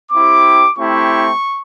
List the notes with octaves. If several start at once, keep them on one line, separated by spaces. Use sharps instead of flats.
C4 E4 G4 D6
A3 C4 E4 G4 C#6